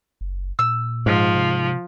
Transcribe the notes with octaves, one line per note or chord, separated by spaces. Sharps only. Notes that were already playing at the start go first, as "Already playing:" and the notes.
F#1
A#2 E6
G#2 F3
C3